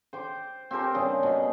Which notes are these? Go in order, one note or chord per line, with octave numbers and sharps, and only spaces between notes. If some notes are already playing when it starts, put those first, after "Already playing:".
C5 G5 D6
C4 G4 A#4 A5
G2 C#3 G#4
B2